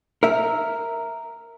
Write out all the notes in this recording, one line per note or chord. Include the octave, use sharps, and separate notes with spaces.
A#4 E5